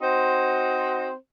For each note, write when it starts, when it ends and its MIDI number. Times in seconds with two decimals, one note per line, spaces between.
0.01 1.12 60
0.01 1.12 63
0.01 1.12 66
0.01 1.12 72